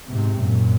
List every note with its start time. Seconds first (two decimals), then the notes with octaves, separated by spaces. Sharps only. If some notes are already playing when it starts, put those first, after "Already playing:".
0.09 G#2 C3
0.42 F#2 A#2